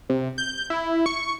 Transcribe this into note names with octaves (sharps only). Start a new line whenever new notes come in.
C3
G6
E4
C#6